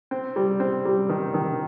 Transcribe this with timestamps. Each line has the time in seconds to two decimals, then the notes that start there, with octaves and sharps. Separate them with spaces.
0.11 C4
0.36 G3
0.60 C4
0.85 G3
1.09 D#3
1.34 D#3